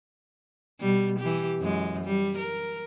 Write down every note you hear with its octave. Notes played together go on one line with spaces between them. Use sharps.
B2 G3
E3 G4
F#2 G#3
G3
A#4